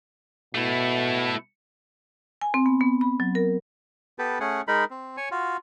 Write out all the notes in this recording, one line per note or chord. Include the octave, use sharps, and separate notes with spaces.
B2 A3 E4
G#5
C4
B3
B3
B5
F#3
A#4
B3 G4 A4 B4
A3 C#4 G#4 F#5
G#3 D#4 A#4 B5
C4
C#5 G#5
F4 F#4